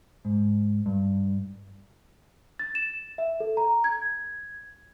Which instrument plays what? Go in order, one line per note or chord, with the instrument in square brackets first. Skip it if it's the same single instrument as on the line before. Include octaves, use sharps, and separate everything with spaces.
[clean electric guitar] G#2
G2
[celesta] A6
E7
E5
A4
A#5
G#6